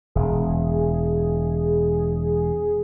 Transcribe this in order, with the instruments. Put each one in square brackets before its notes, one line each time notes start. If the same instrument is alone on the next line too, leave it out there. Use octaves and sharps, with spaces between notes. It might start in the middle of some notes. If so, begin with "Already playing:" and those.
[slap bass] E1 [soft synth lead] G#4